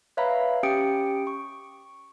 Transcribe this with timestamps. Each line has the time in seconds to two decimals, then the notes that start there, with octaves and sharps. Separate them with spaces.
0.17 B4 C#5 E5 F5 A#5 B5
0.63 C#4 G4 G5 D#6 C#7 D7
1.27 C#6